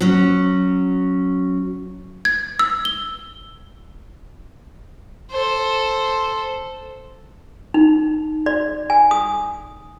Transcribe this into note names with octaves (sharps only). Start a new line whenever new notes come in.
F#3 C#4
G#6
E6
G7
A4 C5
D#4
D5
G#5
D#6